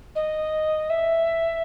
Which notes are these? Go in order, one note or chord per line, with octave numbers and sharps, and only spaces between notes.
D#5
E5